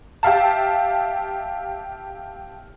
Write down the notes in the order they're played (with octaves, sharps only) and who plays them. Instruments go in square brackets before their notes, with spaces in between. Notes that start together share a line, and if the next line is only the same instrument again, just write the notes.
[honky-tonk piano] G4 E5 F5 A5